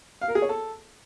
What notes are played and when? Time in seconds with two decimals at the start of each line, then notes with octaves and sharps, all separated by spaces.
0.21 F5
0.28 A#4
0.35 G#4
0.42 C#5
0.49 A4